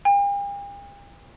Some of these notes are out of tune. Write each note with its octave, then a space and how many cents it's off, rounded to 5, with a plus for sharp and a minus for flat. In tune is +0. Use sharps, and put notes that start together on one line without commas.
G5 +45